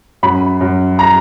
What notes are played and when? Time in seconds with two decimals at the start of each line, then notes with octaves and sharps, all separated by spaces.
0.23 F#2 B5
0.61 F#2
0.99 A#5